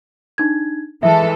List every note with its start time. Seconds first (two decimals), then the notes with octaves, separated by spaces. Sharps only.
0.38 D4 D#4 G#6
1.03 E3 G#3 A4 E5